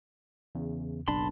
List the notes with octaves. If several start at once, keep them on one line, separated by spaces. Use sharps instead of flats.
E2 C#3
F#1 B1 D4 A5 B5 C6